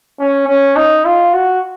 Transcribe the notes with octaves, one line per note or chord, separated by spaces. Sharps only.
C#4
C#4
D#4
F4
F#4